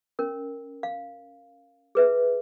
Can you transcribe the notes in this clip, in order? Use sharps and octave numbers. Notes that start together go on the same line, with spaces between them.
C#4 A#4
F5
G#4 B4 E5